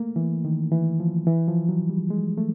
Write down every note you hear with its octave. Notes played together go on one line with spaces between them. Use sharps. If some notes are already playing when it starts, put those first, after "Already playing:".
Already playing: A3 A#3
E3
D#3
E3
F3
E3
F3
F#3
G3
G#3
A3